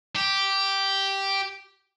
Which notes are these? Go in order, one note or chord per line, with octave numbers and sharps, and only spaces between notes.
G4